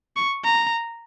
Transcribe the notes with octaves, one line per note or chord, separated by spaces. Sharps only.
C#6
A#5